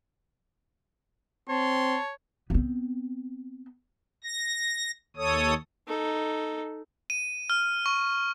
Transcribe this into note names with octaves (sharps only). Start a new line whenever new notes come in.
C4 C#5 A5 C6
B3 C4
A#6
D#2 A4 C#5 D#6
D#4 A4
D#7
F6
C#6